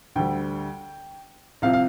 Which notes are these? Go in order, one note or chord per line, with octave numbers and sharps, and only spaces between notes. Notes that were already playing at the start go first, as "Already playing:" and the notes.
D2 D3 G3 G5
C2 C3 F3 F5
F5